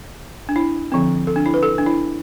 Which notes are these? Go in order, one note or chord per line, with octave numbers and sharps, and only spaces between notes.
D4
E4
D3 F3 C4
A4
D4
E4
B4
A4
D4
E4